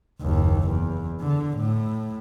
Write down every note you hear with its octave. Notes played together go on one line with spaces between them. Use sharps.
F#1 D#2
E2
D3
A2